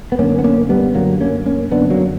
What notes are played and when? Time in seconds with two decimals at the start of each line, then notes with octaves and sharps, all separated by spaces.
0.12 B3
0.19 F#2 D3 A#3 C#4
0.39 B3
0.44 A#3 C#4
0.69 G3 B3
0.95 F#2 D3 F#3 A#3
1.21 A#3 C#4
1.46 A#3 C#4
1.71 F#2 D3 B3 D4
1.90 F#3 A#3